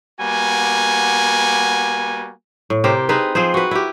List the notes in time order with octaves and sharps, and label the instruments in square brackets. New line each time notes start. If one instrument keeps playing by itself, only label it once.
[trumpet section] G3 A#3 B3 F#4 G#5
[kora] A2
C3 G4 A#4 C5
C4 D#4 G#4 B4
F3 C4 G#4 C5
F#4 B4
E4 G4